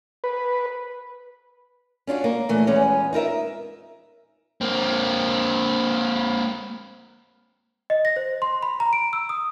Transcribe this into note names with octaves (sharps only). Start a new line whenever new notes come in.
B4
C#4 D4 F4 F#4
A#3
A#2 E3 A3
E2 G#3 B3 C#4 G#4
D#4 F4 A#4 E5
A#3 C4
D#5
A#6
C5
C6
B5
A#5
D7
E6
D#6